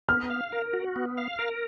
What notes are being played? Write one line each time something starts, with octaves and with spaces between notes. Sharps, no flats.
B3 F6
F5
A#4
F#4
B3
F5
A#4